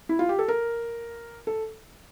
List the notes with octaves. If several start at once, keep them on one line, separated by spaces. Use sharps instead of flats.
E4
F4
G4
A4
A#4
A4